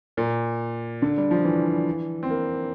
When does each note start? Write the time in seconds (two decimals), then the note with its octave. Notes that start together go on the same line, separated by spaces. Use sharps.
0.17 A#2
1.02 D3
1.18 G3
1.31 F3
1.44 E3
2.23 C4
2.30 A#3